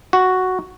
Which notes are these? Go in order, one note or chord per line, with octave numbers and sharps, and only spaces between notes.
F#4